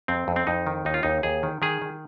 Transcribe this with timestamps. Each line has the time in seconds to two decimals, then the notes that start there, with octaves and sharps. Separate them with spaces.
0.08 F2 C4
0.28 F2
0.36 C4
0.47 F2 D#4
0.67 D#3
0.85 D#2 D#4
0.94 F4
1.03 D#2 D#4
1.23 D#2 G#4
1.43 D#3
1.62 D#3 G#4
1.82 D#3